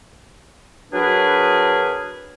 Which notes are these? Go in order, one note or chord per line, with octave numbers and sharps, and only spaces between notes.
F#3 D4 F#4 G#4 A#4 B4